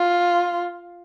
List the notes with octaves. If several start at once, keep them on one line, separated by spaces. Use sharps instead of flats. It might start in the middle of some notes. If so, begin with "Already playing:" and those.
Already playing: F4